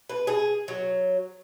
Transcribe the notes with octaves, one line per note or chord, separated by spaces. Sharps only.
B4
G#4
F#3